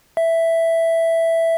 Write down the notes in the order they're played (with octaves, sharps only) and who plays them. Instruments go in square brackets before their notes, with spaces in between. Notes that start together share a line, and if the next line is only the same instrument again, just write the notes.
[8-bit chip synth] E5